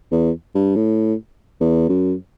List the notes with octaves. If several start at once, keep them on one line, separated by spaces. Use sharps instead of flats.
E2
G2
A2
E2
F#2